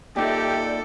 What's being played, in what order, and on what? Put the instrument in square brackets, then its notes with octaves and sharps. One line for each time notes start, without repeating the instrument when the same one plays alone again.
[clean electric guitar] A#2 D#4 [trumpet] G4 [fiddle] A4 [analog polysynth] D5 E5 G5